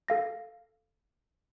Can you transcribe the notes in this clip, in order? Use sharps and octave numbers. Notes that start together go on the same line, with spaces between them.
A4 F5 A#6